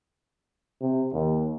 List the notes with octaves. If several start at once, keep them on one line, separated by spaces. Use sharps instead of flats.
C3
D#2